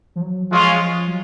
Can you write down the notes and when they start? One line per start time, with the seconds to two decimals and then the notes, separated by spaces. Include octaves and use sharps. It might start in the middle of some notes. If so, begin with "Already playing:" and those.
0.16 F3
0.21 F#3
0.50 F3 G#3 C#4 F4
1.07 F#3